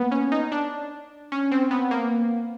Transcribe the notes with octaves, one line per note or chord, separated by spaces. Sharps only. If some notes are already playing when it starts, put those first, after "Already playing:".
Already playing: A#3 B3
C#4
D#4
D4
C#4
C4
B3
A#3